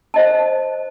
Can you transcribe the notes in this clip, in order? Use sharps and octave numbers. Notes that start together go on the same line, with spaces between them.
C5 D#5 A5